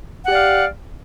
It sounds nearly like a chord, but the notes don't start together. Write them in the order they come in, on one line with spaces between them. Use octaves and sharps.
F#5 G4 D5 F5